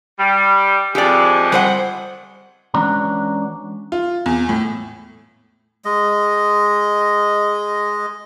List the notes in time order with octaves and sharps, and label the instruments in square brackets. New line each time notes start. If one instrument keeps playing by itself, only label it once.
[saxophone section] G3
[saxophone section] F2 G#3 [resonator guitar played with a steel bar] G4 D5
[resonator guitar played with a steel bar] G3 C5 F#5
[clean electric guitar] E3 G#3 C#4 D4 F#4 A#5
[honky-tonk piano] F4
E2
A2
[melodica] G#3 D#5